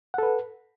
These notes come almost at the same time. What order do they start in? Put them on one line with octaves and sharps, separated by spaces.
F#5 A4 B4